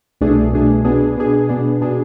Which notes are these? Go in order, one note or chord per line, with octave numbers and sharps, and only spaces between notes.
C2 B2 A3 D4 G#4
C2 B2 A3 D4 G#4
B2 B3 D4 G#4
B2 B3 D4 G#4
B2 B3 D4 G#4
B2 B3 D4 G#4